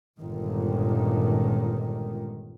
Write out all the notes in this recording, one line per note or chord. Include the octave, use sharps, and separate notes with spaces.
G1 C#2 A#2 D#3